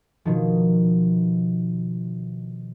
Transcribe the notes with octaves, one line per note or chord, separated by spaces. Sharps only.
B2 D#3 F3